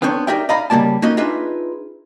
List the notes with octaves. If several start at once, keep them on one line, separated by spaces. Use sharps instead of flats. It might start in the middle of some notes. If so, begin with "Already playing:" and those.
B3 C4 D4 C5 C#5
D#4 G4 A#4 D5 E5 G5
D5 D#5 F5 A#5 B5
C#3 G3 A#3 D5 A5
A#3 C#4 D#4 F#4 D#5
D4 D#4 F4 G#4 B4 E5